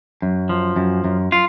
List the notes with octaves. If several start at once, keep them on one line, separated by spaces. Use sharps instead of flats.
F#2
F3
F#2
F#2
F4